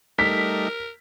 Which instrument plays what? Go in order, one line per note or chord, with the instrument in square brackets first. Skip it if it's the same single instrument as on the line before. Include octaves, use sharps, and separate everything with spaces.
[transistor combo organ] G3 A3 D#4 [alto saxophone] A#4 [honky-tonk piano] B6